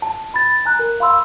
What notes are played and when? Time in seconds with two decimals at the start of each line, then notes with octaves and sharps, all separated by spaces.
0.02 A5
0.34 B5 A6
0.65 G#5 A#5 F#6
0.79 A#4
1.00 F5 B5 C6 E6